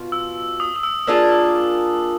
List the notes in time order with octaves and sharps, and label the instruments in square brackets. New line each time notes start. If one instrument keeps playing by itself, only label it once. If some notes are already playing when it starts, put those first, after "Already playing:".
Already playing: [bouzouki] B2 F4
[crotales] E6
D#6
D#6
E6
[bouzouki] A#3 D4 F4 G#4 [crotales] E6
[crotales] E6